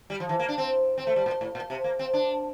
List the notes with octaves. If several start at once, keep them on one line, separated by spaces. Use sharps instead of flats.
G3
F3
E3
A#3
D4
C4
C4
A3
G3
A#2
A2
A#2
C3
A#3
C4
D4